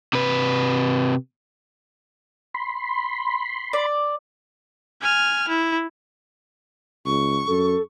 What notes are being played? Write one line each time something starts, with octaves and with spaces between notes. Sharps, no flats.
C3 B4
B5 C6
D5
G#5 F6
E4
C#2 C#6
F#2 A4